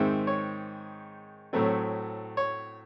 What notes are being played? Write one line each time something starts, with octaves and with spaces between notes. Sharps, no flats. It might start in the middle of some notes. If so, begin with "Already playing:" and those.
Already playing: G#2 D#3 G#3 C4 E5
C#5
A2 F#3 A3 C4
C#5